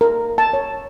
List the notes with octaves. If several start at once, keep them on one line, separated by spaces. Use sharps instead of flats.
A#4
A5
C#5